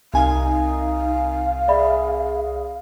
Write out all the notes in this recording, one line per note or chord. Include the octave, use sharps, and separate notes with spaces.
C2 D#4 F5 G#5
G#4 D5 E5 B5